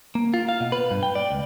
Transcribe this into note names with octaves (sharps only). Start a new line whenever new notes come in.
A#3
F4
F5
B2
B4
G2
G5
D5
C#2